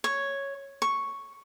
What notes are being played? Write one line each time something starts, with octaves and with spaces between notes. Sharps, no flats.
C#5
C#6